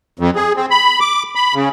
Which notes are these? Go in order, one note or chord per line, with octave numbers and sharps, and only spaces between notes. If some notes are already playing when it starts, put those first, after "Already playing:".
F2
G#4
C4
B5
D6
B5
C#3